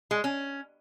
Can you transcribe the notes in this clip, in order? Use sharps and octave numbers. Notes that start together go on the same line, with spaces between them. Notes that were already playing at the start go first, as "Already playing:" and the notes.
G#3
C#4